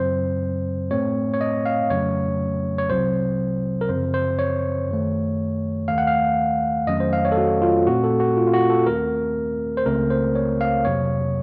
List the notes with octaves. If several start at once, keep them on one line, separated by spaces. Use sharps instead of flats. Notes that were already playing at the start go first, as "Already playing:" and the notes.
Already playing: F#2 C#3 F#3 C4 C5
A2 A3 C4 C#5
C#5
D#5
F5
F2 C#3 F#3 A3 C#4 C#5
C#5
C2 C3 F#3 C4 C5
A#4
F#2 C#3 F3 C4 C5
C5
C#5
F#2 D#3 A3
D#2 D#3 A3 F5
F#5
F5
F2 D#3 F#3 A3 C#4 D#5
C5
F5
C#5
A4
F#4
F4
A#2 A3 C4 F#4
A4
F#4
F4
F4
F#4
A4
D#2 D#3 A3 C4 A#4
C5
C#2 C#3 A3 C4 A#4
C5
C#5
F5
F2 C3 F#3 A#3 C#5